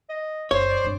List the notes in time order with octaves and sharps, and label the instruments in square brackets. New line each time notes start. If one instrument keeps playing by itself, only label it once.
[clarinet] D#5
[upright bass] F#1 [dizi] C5 [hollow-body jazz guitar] C#5
[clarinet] D5
[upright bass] G2 C4